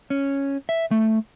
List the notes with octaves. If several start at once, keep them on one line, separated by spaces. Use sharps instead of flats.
C#4
E5
A3